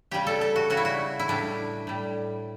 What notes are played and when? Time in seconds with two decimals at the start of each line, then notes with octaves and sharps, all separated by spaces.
0.11 C#3 G3 G4
0.27 A4
0.41 A4
0.56 F#4
0.70 C#3 G3 F#4
0.77 E4
0.85 F#4
1.19 E4
1.28 A2 G3 D4
1.87 A2 G3